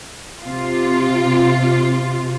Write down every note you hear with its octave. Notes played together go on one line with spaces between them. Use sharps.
C3 F4